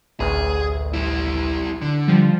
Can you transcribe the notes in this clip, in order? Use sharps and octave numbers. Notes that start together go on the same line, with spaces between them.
A1 D2 G#4
G3 E4
D3
F3 G3